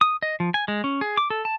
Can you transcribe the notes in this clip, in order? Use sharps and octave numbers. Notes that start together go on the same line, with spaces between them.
D#6
D#5
F3
G#5
G#3
C#4
G#4
D6
A4
A5